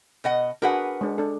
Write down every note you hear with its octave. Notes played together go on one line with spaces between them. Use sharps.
B2 D#5 F#5
D4 F#4 G#4 A#4 B4 F#5
G#3 D4
D4 A4